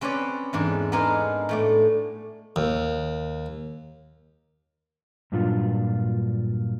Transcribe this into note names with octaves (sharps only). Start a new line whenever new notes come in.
C4 C#4 B4 C#5 D5
E2 G#2 D4
B3 D4 D#4 G#4 A#4 C5
A2 A3 D5
D#2
G2 A#2 F#3 D4 F4